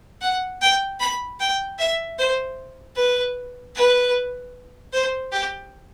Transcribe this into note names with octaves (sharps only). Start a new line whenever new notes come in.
F#5
G5
B5
G5
E5
C5
B4
B4
C5
G4